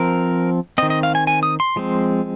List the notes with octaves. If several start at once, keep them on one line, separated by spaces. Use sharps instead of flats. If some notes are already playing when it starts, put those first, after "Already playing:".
Already playing: F3 C4 A#4
D#3 C4 D#5
D#5
F5
G#5
G#5
D#6
C6
F3 G#3 C4